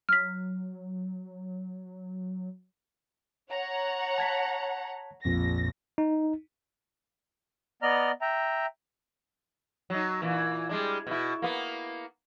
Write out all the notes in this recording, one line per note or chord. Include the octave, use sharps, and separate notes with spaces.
F#3 F6 B6
C#5 F#5 A#5
A5 G#6 B6
A#1 F2 A#2 A#6
D#4
B3 D5 D#5 A#5 F6
E5 G5 A#5
F#3 D#4
A#2 E3
G3 G#3 D4
B2 E4
A#3 B3